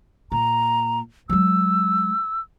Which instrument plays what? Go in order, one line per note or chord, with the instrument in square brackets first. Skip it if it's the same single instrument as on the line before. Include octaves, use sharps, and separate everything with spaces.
[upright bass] A#2 [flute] A#5
[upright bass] F#3 G#3 [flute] E6